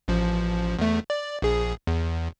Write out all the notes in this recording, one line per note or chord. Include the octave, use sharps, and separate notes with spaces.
A1 F3
E2 A3
D5
A#1 G#4
E2